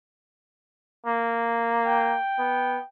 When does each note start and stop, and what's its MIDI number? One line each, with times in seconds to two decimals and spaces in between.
1.06 2.17 58
1.86 2.84 79
2.39 2.78 59